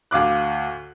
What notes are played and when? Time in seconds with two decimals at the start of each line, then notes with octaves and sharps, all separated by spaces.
0.11 D2 F5 D6 F#6